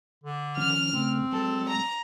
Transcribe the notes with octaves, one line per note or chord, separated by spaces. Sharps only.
D3
D#3 F3 C#4 F6
C#3 A3 C4
F#3 G#3 A4
A#5